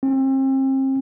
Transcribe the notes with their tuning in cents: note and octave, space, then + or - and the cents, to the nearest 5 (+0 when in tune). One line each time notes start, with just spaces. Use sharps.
C4 +35